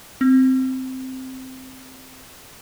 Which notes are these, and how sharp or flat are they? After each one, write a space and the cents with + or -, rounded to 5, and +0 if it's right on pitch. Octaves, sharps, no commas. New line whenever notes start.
C4 -5